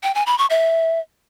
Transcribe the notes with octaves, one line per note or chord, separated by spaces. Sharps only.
G5
G#5
B5
C#6
E5